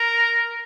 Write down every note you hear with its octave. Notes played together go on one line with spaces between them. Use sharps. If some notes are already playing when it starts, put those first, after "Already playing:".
Already playing: A#4